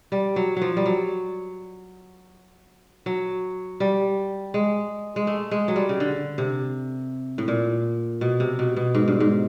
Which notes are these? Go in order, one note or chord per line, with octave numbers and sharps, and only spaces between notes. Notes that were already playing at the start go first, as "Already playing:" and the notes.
G3
F#3
F3 F#3
G3
F#3
F#3
G3
G#3
G#3
A3
G#3
F#3
G3
C#3
D3
C3
A2
A#2
B2
C3
B2
B2
G#2
G2
G#2